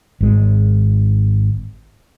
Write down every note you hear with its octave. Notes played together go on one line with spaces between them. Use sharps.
G#1 G#3